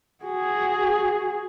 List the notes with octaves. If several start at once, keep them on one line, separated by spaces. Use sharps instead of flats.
F#4 G#4